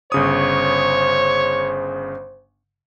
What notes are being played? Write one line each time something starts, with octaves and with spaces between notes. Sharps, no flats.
G1 C#3 C5 C#5 D#6